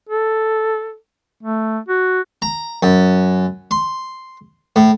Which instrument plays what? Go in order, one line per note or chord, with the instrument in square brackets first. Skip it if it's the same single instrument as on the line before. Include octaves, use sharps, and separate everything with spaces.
[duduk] A4
A3
F#4
[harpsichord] A#5
F#2
C6
A2